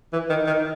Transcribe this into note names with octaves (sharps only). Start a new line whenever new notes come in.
E3
D#3
D#3